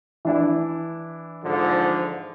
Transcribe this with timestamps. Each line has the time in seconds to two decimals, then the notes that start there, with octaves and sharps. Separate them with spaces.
0.25 E3 D4 E4
1.44 G#2 D3 F3